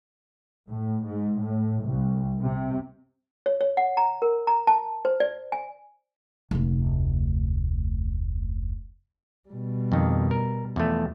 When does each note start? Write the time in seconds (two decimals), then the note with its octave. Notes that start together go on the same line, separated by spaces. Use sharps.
0.68 A2
1.04 G#2
1.40 A2
1.84 C2
2.40 C3
3.46 C#5
3.61 C#5
3.77 F#5
3.97 A#5
4.22 A#4
4.47 A#5
4.67 A5
5.05 C5
5.20 D5
5.52 G#5
6.51 F1 D2
9.49 B2 G3
9.92 F2 D#3
10.31 A#4
10.76 E2 F3 A3